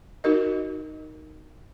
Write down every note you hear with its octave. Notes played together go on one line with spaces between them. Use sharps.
D#4 F#4 A#4 D#5